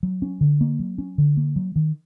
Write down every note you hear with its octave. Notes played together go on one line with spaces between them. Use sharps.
F#3
C#4
D3
A#3
F#3
C#4
D3
A#3
F#3
D#3